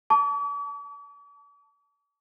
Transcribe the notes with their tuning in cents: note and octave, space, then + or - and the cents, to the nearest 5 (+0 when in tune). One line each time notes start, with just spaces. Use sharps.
A5 +0 D6 -45